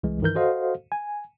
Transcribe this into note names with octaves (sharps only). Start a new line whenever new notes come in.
C2 E3 G#3
G2 D#3 E3 A#4 G6
F#4 A4 C5 D#5 F5 F#5
G#5